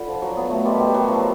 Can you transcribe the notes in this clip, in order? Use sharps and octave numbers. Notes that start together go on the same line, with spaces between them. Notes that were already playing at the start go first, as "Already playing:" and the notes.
Already playing: F4 A4 D5 F#5 B5
F3
F#3
B3
A3
G3 A#4 D#5 G5 C6
G3
F#3
F3